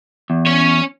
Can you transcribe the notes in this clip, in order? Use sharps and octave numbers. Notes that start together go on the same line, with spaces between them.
E2
C#4 C#5